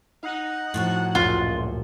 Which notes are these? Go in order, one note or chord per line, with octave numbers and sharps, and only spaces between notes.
D#4 F#5
A2 F3 F#4
C#2 F#2 A#2 F4